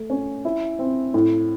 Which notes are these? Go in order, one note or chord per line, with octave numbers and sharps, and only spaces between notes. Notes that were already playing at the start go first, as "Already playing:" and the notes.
Already playing: A3
C#4
E4
C4
A2